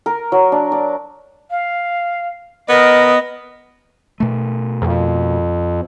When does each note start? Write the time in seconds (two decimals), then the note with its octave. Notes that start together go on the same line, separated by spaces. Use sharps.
0.06 A#4
0.32 F#3
0.52 D4
0.72 D5
1.50 F5
2.69 B3 A#4 D#5
4.20 B2 A3
4.82 F2